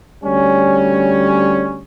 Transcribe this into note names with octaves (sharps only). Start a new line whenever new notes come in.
D2 G3 C#4